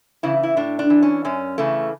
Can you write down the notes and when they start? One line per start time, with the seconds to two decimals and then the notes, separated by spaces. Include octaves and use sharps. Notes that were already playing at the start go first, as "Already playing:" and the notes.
0.23 C#3 E3 E4
0.43 E4
0.57 A2 D4
0.79 D4
0.90 E3
1.03 C#4
1.25 F#2 C#4
1.58 C#3 E3 A3